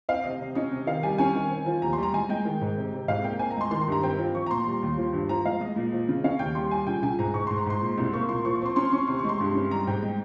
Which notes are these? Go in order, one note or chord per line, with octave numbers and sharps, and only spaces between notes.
C4 F5
C3 D#5
C3
C#4 D#5
C3
D#3 F5
G3 G#5
C#4 G#5
D#3
C4
F3
D#2 A#5
G3 C6
A#5
G#3 G#5
G#3 G5
D#3
G#2
C3
C3
G#2 F5
A#3 G5
C4 G#5
A#5
G#3 C6
D#3 C6
C6
G2 A#5
C4 G5
F3
F3 C#6
A#5
A#2 C6
G3
D#2
F3
G2
F3 A#5
G#3 F5
G#3 D#5
A#2
F3
C#3
C#4 F5
D#2 G5
G3 C6
G3 G#5
C#2 G5
C#2 G#5
G#2 A#5
G#2 C#6
G#2 C6
A#5
G#2 C6
A#2
C2
A#3 C#6
A#2 C6
F3 C#6
C#6
C4 C6
C#4 C6
C#4 C#6
C3 C6
C#6
G#3 C6
G2
C#4
G3 A#5
G#2 G5
G#3